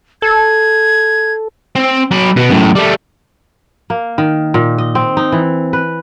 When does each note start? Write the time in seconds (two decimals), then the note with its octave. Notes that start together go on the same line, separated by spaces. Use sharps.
0.22 A4 G#6
1.76 C4
2.11 F#3 B5
2.36 B2 B3
2.50 F#2 A2
2.75 G3 A3
3.90 A#3
4.18 D#3
4.54 A#2
4.78 D#5
4.95 C4
5.17 D#4
5.32 E3
5.73 B4